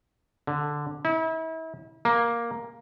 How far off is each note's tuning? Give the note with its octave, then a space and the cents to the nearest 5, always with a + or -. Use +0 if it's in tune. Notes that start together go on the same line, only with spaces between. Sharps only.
D3 +0
E4 -35
A#3 +5